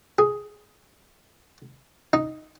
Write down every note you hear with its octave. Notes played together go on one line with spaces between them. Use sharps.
G#4
D#4